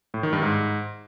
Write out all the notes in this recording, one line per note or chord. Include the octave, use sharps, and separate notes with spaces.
A2
D#3
G2
G#2